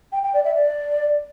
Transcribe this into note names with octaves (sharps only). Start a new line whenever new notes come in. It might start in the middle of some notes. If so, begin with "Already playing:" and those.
G5
G5
D5
E5
D5